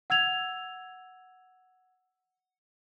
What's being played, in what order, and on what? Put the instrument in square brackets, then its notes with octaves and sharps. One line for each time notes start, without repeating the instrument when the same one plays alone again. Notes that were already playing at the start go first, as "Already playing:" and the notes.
[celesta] F#5 E6 G#6 F7